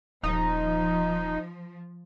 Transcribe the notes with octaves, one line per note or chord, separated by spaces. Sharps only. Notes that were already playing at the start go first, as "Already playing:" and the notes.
D#1 F3 D#4